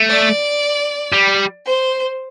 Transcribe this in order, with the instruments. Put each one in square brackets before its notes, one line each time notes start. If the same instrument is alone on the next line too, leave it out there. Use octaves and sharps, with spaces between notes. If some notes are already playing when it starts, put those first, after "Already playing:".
Already playing: [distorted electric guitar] A3
[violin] D5
[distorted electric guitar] G3
[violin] C5